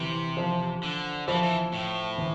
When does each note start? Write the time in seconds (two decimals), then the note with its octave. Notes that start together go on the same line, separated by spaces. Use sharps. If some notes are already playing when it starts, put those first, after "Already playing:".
Already playing: C3 E3
0.37 F3
0.83 D3
1.28 E3 F3
1.43 E3
1.73 A2
2.18 E3